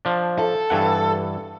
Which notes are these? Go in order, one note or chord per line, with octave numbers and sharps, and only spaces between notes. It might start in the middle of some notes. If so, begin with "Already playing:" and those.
F3 D4
A4
G2 E3 F#5